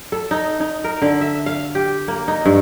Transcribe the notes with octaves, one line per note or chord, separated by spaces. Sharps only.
A4
D#4
D#4
A#4
D3
E5
F5
G4
A#3
D#4
G2